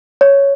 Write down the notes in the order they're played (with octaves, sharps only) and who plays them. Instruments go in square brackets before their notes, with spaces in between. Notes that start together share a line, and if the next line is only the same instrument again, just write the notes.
[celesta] C#5